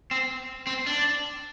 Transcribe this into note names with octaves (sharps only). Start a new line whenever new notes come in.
C4
C4
D4